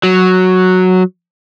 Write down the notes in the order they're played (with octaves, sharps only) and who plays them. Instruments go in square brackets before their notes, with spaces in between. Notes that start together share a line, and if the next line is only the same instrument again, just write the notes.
[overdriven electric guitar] F#3